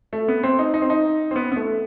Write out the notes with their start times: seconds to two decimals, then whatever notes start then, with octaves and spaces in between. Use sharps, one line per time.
0.13 A3
0.28 B3
0.43 C4
0.59 D#4
0.74 D#4
0.82 C4
0.90 D#4
1.31 C4
1.36 B3
1.52 B3
1.56 A3